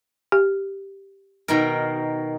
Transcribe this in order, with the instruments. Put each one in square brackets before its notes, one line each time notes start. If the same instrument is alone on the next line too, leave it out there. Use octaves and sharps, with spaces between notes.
[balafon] G4
[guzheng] B2 D#3 A#4